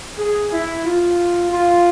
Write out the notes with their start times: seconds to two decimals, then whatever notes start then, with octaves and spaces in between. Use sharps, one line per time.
0.19 G#4
0.52 E4
0.85 F4
1.52 F4